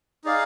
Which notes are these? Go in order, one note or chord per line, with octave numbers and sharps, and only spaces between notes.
D#4 G#4 D5 F5